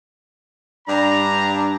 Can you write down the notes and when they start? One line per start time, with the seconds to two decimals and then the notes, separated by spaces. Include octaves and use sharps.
0.88 G2 D4 A#5